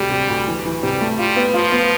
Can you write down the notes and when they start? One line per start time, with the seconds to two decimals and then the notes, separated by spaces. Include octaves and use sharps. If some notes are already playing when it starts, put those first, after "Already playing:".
Already playing: D2 C3 G3
0.11 C3
0.29 D2
0.48 E3
0.66 E3
0.83 C3 G3
1.01 A3
1.18 G3 F4
1.37 B3
1.54 F3 F4
1.72 B3